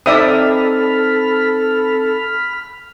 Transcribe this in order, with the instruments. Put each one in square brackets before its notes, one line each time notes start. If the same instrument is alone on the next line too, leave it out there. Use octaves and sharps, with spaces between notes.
[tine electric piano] C4 D#4 [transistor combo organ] A4 [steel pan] D5 E5 D#6 [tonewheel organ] B5 F6